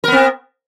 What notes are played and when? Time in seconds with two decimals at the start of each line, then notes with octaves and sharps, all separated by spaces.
0.04 A#4
0.08 B3
0.12 C4